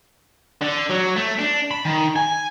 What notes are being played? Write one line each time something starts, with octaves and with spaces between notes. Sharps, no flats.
D3
F#3
A3
D4
B5
D#3
G#5